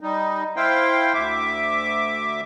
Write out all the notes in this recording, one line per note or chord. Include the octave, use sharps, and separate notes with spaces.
G3 D#4
E4 C5 F5 G5
D2 E5 D6